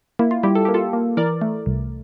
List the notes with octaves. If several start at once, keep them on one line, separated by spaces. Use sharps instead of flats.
A#3 E4
F4
G3 E4 G4
A4
A#3 G4
F4 A4
A#3
E3 A#4 D5
A3
C2